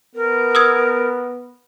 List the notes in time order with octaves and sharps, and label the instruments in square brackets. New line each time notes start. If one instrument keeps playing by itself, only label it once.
[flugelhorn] B3 [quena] A#4
[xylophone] D#6 E6 G#6